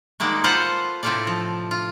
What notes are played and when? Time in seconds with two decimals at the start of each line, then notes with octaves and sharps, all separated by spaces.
0.20 D#3 G3 G#3 A#3 F#4
0.44 F4 A4 B4 C5 F5 F#5
1.03 A2 C3 C4 F4 A4 D5
1.27 F3
1.71 F4